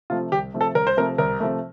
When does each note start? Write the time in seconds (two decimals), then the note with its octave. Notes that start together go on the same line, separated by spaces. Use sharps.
0.10 C3 F3 A3 F4
0.32 C2 G4
0.54 C3 F3 A3
0.61 A4
0.75 C2 A#4
0.87 C5
0.97 C3 F3 A3 A#4
1.18 C2 A#4
1.40 C3 F3 A3